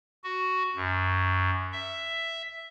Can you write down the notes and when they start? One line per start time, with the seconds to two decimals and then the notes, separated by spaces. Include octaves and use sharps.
0.24 F#4
0.76 F#2
1.72 E5